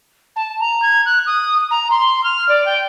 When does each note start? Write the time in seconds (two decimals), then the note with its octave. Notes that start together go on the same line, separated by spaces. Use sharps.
0.36 A5
0.60 A#5
0.82 G#6
1.06 F#6
1.26 D#6
1.71 A#5
1.91 C6
2.24 F6
2.49 D5
2.66 G5